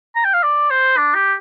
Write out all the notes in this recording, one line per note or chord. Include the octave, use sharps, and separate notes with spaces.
A#5
G5
F5
D5
C5
D4
G4